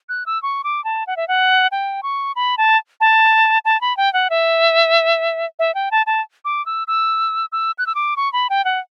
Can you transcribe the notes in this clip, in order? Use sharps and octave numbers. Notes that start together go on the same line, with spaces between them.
F#6
E6
C#6
D6
A5
F#5
E5
F#5
G5
C#6
B5
A5
A5
A5
B5
G5
F#5
E5
E5
G5
A5
A5
D6
E6
E6
E6
F#6
E6
D6
C#6
B5
G5
F#5